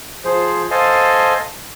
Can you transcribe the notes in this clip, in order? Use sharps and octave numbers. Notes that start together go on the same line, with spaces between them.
F3 G#4 C5
A4 C5 D#5 F5 G#5 A5